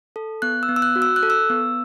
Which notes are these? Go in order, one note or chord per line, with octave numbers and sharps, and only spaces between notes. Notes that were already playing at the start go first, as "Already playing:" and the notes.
A4
B3 F#6
E6
B3
E6
F#6
F#4
E6
F#6
A4
E6
B3